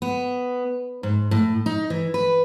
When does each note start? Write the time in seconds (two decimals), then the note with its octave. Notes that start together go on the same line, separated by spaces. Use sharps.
0.02 B3
1.03 G#2
1.31 A2
1.66 D#4
1.90 E3
2.14 B4